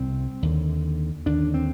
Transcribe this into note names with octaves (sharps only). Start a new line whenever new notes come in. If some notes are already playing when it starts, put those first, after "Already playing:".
Already playing: C2 C3 C4
D#2 D3
D#2 D3 D4
C4